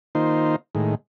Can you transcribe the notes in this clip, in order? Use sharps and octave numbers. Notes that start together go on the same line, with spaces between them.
D#3 A#3 D#4 F4 C5
A2 D#3 G#3